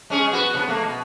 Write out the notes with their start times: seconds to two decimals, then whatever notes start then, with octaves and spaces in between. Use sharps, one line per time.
0.10 G#3 C#4 G#4
0.31 B3 F#4 B4
0.55 C3 B3
0.68 A3 A#3
0.82 B2